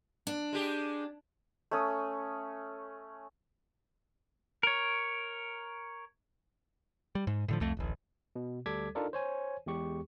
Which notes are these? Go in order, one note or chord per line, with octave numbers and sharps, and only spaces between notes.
D4
G#3 G4 G#4
A3 C#4 D#6
A#4 C#5
G3
G#2
A2 D3 F3
C2 F2 A3
D1 A1
B2
D2 G3 A4 D6 G#6 B6
D4 D#4 F4 A4 A#4 D5
C5 C#5 G#5
E2 G#3 G4 C#6